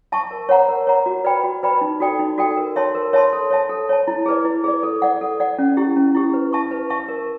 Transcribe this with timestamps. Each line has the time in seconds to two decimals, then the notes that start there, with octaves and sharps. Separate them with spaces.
0.12 E5 A5 C#6
0.31 A#4
0.49 C#5 F#5 A#5
0.69 A#4
0.87 C#5 F#5 A#5
1.06 F#4
1.25 B4 D5 G5 B5
1.44 F#4
1.63 B4 D5 G5 B5
1.81 D#4
2.00 F#4 A4 D5 G5
2.19 D#4
2.38 F#4 A4 D5 G5
2.57 A#4
2.76 C#5 E5 A5 C6
2.95 A#4
3.13 C#5 E5 A5 C6
3.33 A4
3.50 C#5 E5 A5
3.69 A4
3.89 C#5 E5 A5
4.08 E4
4.26 G#4 B4 D5
4.45 E4
4.64 G#4 B4 D5
4.83 A4
5.02 D5 F#5
5.21 A4
5.40 D5 F#5
5.59 C#4
5.77 E4 G4
5.97 C#4
6.15 E4 G4
6.34 B4
6.53 E5 A5 C#6
6.71 B4
6.90 E5 A5 C#6
7.08 A#4